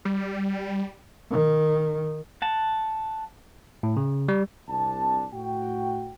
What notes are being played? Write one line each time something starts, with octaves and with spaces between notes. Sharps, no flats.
G3
D#3
F#5 A5
A2
C#3
G3
C2 C3 D4 A5
A2 F#4 G5